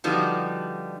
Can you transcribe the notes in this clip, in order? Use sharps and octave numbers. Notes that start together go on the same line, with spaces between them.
D3 F3 G3 B3 D#4 F#4